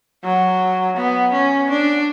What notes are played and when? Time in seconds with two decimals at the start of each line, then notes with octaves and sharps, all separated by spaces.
0.24 F#3
0.97 B3
1.32 C#4
1.70 D4